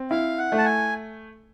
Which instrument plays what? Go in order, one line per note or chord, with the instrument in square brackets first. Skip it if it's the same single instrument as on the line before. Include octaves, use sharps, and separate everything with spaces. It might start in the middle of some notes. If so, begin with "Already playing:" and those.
Already playing: [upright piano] C4
[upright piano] E4 [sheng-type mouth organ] F5
[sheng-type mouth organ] F#5
[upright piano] A3
[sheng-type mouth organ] A5
G#5